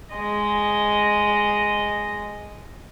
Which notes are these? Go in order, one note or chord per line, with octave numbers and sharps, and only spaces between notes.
G#3 D#5